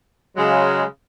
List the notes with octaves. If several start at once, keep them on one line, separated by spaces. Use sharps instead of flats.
C#3 F#3 G#3